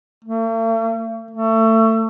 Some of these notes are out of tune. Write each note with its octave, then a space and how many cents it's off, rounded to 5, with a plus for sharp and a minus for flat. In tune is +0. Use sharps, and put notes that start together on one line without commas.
A3 +45
A3 +25